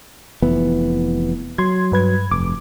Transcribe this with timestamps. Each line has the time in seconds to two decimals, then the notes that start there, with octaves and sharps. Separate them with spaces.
0.42 F1 E3 B3
1.58 F#3 C6 G#6
1.92 G2 B4 G#6
2.31 F1 D6